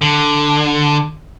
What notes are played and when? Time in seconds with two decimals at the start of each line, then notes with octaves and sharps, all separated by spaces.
0.01 D3